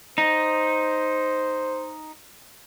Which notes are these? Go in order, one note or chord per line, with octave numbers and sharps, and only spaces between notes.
D#4 C5